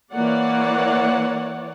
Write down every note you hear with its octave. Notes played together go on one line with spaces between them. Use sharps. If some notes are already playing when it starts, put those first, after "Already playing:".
E3 A#3 C#5 D5 F#5